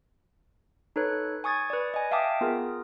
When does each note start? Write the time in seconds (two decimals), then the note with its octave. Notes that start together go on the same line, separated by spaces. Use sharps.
0.96 D#4 A4 B4 C#5 F#6
1.44 G#5 C#6 D#6 G#6 A6
1.70 B4 D5
1.94 D#5 G#5
2.11 E5 F5 G5 A5 D6 D#6
2.41 B3 F4 G#4 A#4